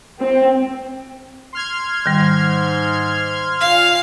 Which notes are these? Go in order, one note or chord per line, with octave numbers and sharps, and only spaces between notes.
C4
C6 F6 G#6
G#2 D#3 G3
A#2 F5